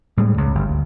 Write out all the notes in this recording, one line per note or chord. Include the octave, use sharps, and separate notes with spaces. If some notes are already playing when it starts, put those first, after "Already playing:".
A2 G3 G#3
C#2
G1
D2